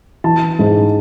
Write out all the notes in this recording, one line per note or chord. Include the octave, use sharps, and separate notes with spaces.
E3 A5
G#2